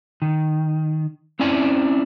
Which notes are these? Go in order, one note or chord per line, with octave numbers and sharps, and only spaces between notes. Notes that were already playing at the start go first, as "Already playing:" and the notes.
D#3
C4 C#4 E4 D5 G#5